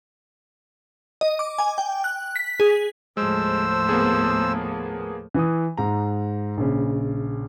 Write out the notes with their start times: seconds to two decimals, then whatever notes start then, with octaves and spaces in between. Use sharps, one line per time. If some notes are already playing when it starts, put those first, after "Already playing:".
1.21 D#5
1.39 D6
1.59 G#5
1.78 G5
2.04 F#6
2.36 B6
2.60 G#4
3.17 D#2 A2 F3 G#3 C5 E6
3.89 A#3 B3 G#4
5.34 E3 D#6
5.77 G#2 A#5
6.57 A#1 C#3